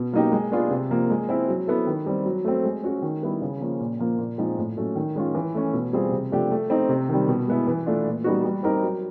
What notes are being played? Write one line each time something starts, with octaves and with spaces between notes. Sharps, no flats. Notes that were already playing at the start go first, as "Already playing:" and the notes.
Already playing: B2
F#3 A#3 D#4 G4
G#3
B3 D4 F4 G#4
C3
F3 A#3
G#3
C4 E4
F#3
B3 E4 A4
D#3
G3 C4
F#3
A3 C4
G#3
C#4 F#4
D#3
G3 B3 E4
C#3
F3 A#3 C#4
A#2
F3 A#3
A#2
F3 G#3 C4 D#4
A2
F#3 A3 C#4
D#3
G#3 C#4 F4
E3
A3 C#4
B2
G3 C4 F4 G#4
C3
F3 A3 D4 G4
A3
C4 D#4
C3
D#3 G3
B2
G#3 B3 E4
E3
A3 D4 F4
A#2
G3 B3 D#4 F#4
G3
C4 D#4 G4 A#4
F#3